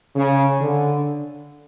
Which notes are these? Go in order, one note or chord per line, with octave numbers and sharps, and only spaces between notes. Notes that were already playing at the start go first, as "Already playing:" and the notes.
C#3
D3